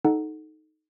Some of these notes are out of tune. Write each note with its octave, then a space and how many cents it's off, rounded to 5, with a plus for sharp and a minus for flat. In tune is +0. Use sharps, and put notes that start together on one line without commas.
D#4 +0 A4 -15 F#5 +0